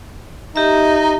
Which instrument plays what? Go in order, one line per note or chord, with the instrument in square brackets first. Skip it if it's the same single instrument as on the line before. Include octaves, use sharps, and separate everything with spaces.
[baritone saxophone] D#4 [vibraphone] G4 E5